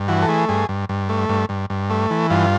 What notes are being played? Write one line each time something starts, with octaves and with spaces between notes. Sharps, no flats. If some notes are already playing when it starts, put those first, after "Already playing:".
Already playing: G2
E3 F#4
A4
A3 G#4
G2 G#4
G2
G2
A3
G2
G2
G2
A3
E3
G2 F4